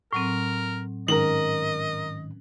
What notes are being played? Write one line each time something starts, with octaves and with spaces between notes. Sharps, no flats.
A2 F#3 C4 A#4
G#2 D#3 C#4 A#4 D#5 F#7